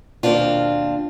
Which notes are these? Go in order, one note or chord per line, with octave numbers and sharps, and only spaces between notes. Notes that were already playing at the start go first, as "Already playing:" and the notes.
D#2 B2 A#3 C4 D4 F4